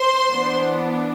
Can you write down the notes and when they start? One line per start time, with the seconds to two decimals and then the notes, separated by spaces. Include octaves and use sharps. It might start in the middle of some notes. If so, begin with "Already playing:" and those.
Already playing: C5 C6
0.29 E3 B3 D4